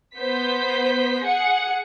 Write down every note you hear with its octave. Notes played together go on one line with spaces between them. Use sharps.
B3 C5 G6 B6
G#4 F#5 C#7